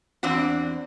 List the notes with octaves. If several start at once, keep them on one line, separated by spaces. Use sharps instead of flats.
E2 C4 D4 F#4